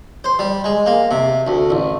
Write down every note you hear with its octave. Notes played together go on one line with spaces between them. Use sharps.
C5
G3
G#3
A#3
C3
D2
A1